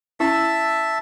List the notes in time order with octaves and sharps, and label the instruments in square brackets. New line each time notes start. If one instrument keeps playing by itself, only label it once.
[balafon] C#4 E4 [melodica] E5 A5 E6